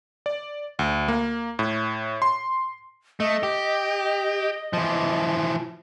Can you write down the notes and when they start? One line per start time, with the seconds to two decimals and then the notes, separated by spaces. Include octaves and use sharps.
0.26 D5
0.79 D2
1.08 A#3
1.59 A2
2.22 C6
3.20 A3 D#5
3.43 G4
4.73 E3 F3